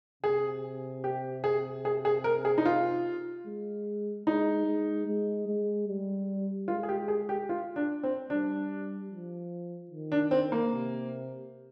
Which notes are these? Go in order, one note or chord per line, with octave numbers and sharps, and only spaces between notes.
C3 G#4
G4
G#4
G#4
G#4
A#4
G#4
D#4
F4
G#3
G#3 D#4
G#3
G#3
G#3
G3
G#3 F4
G#4
G4
G#4
G4
F4
D4
C4
G3 D4
F3
D#3
D4
C4
A#3
C3